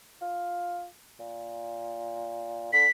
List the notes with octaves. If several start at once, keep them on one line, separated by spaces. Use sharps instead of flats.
F4
A#2
D3 B6